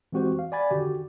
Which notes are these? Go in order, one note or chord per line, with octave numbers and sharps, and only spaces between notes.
E3 G#3 C4 F#4 G4 C5
F5
D5 F#5 G#5 B5 G#6 A6
D3 D#3 F#4 G4